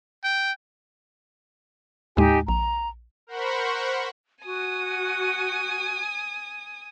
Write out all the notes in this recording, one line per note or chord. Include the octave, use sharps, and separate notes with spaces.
G5
D#2 A2 G#3 D#4 G4 G#5
A#1 A#5
A#4 C5 F#5 B5 C#6
F#4 G#5 D#6